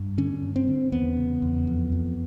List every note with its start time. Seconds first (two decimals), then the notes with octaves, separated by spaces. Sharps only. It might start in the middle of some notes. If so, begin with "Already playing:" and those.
Already playing: G2
0.18 D3 C#4
0.42 G2
0.56 C4
0.68 D3
0.92 E2 B3
1.17 C#3
1.42 E2
1.67 F2
1.92 F2